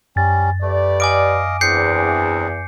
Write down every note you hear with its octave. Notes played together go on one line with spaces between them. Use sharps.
F#2 G3 C#4 A6
A3 G4 B4 D5
D#5 F5 G#5 D6 D7
E2 C4 D4 G#4 G6 C7 C#7